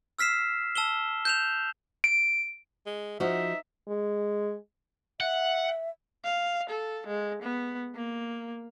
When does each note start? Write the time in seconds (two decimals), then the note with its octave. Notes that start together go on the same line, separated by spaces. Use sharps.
0.19 E6 F6 B6 C7 E7
0.75 A5 E6 E7 G7
1.25 G6 E7 F7
2.04 D7
2.86 G#3
3.20 F3 D#4 F#4 E5
3.88 G#3
5.21 E5 F#5
6.24 F5
6.70 A4
7.07 G#3
7.43 B3
7.95 A#3